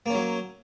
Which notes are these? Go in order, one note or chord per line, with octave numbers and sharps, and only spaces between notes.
F#3 A#3 C#4